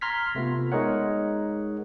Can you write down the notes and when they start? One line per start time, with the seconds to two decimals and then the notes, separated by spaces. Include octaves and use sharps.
0.01 A#5 C6 F6 G#6 B6
0.35 C3 A3 B3 F4
0.72 G#3 D#4 G#4 A#4 C#5 F#5